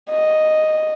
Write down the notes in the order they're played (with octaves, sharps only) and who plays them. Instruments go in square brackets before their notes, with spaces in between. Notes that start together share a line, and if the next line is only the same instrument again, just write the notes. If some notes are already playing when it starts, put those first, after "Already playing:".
[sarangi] D#5